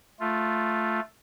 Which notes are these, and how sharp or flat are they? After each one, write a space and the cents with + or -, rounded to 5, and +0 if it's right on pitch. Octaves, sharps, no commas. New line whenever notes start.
A3 +0 F4 +0